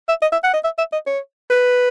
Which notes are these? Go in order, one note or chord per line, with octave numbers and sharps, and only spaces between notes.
E5
D#5
E5
F#5
D#5
E5
E5
D#5
C#5
B4